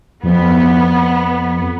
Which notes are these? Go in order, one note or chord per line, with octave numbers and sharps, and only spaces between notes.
F2 B3